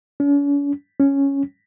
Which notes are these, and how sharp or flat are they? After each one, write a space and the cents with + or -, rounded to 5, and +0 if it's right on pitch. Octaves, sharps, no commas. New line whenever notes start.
C#4 +45
C#4 +0